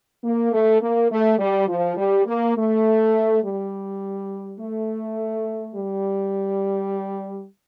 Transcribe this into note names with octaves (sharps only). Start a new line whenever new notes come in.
A#3
A3
A#3
A3
G3
F3
G3
A#3
A3
G3
A3
G3